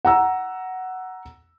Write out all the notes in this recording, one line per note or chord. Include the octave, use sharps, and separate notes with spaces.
F#5 A#5 E6